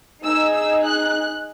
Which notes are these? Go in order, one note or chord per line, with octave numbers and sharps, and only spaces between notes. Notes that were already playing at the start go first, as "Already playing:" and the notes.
D#4 G#4 E6
E6
F#6